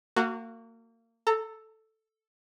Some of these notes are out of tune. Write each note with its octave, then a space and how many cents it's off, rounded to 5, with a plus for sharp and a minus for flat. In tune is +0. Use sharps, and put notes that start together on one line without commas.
A#3 -30 F#4 -5
A4 +0 A#5 -35